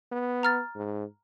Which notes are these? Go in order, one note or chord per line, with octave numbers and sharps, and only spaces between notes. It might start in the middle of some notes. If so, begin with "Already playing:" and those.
B3
A#5 F6 A6
G#2